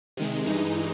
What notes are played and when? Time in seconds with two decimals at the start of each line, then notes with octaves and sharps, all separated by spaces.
0.17 C3 D#3 G#3
0.46 G2 E3 G#3 D#4